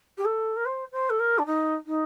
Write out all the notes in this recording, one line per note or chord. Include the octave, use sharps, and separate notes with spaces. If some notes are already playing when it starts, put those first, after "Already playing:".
G4
A4
A#4
C5
C5
A4
A#4
D4
D#4
D#4